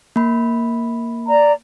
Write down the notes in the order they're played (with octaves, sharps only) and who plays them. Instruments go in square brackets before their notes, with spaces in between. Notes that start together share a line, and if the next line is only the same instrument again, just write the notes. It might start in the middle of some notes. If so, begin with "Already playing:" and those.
[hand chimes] A#3 B5
[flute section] D5 A#5